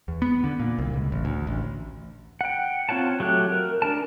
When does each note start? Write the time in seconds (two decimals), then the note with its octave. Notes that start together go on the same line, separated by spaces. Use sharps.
0.08 E2
0.22 B3
0.44 D3
0.60 A#2
0.78 C2
0.94 C#2
1.12 A1
1.25 D2
1.47 A1
2.41 F#5 G5
2.89 C4 F4 C#5 F#5 A5
3.20 F#3 A3 G4 F#6
3.52 A#4
3.82 D4 A#4 A5